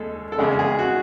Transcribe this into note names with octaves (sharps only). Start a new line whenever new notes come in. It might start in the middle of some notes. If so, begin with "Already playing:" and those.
Already playing: D#2 G#3 A4
A4
E2 C#3 G#3 G#4
G#4
F#4